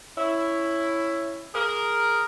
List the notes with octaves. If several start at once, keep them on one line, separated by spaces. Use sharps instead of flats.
C#4 E4
G#4 A#4